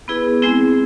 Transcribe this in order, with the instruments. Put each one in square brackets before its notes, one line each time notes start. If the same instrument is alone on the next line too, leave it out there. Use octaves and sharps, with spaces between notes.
[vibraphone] B3 E4 G#4 B4
G#3 C4 E4 G#4